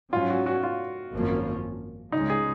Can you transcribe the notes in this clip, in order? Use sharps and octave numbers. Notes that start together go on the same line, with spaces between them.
G#2 F#3 C#4 F4
F#4
F#4
F4
G#1 F#2 F3 A#3 C#4
C#2 C#3 G#3 D#4
G#4